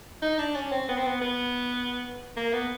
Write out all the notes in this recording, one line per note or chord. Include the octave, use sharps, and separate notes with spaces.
D#4
D4
C#4
C4
B3
C4
B3
B3
A#3
B3